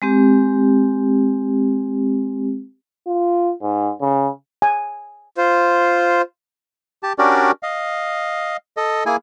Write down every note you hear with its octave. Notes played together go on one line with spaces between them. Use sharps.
G#3 C4 G4
F4
G#2
C#3
G#5
F4 C5
G4 A5
C#4 D4 F#4 G4 A#4 D5
D#5 F5
A4 D#5
A#3 E4 G#4 G#5